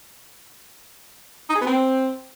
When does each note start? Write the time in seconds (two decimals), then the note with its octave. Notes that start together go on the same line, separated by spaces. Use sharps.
1.50 D#4
1.55 G#4
1.61 B3
1.67 C4